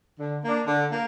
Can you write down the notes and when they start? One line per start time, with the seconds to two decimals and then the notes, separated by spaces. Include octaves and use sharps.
0.19 D3
0.43 A#3 D4
0.67 D3
0.91 A#3